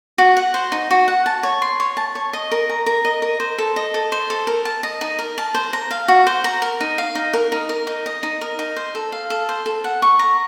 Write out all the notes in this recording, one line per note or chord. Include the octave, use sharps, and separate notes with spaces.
F#4
F#5
C5
D#4
F#4
F#5
A5
C#5
C6
C#5
A5
C#5
D#5
A#4
A#5
A#4
D#5
A#4
C5
A4
D#5
A4
C5
A4
A#4
A5
D#5
D#4
A#4
A5
C5
A#5
F5
F#4
C5
A#5
A#4
D#4
F5
D#4
A#4
D#4
A#4
D#4
D#5
D#4
A#4
D#4
C5
A4
F5
A4
C5
A4
F#5
C#6
A#5